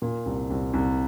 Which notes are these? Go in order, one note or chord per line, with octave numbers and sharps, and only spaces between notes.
A#2
C2
C2
C2